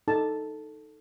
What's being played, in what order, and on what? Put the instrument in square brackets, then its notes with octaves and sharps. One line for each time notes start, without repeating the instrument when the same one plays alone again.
[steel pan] D#4 A4 A5